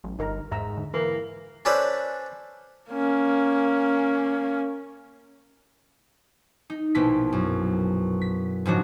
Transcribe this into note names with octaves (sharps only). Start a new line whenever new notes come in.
A1 F#3
G1 D3 D#4 A#4 A#5
E2 G#2 E5 A#5 E6
D3
E3 A#3 B4
C#4 D4 A4 B4 C5 D5
A#3 C#4
D#4
A#1 B2 A#3 E4 B6
F#2
B6
G#2 C#3 F3 D4 D#4 F#4